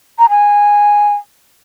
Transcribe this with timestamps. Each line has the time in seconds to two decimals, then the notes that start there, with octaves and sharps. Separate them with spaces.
0.19 A#5
0.30 G#5